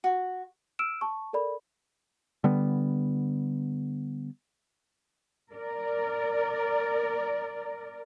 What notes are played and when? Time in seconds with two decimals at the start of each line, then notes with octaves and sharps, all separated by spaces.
0.04 F#4
0.79 E6 F6 D7 E7
1.01 A5 C#6
1.33 A4 A#4 D5 B5
2.44 D3 G3 B3
5.53 A#4 D5